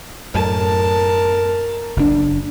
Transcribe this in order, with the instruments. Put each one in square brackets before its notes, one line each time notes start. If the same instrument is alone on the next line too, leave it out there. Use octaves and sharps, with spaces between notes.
[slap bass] F#2 A2 [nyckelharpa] A#4 A5
[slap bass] F#1 F#2 D4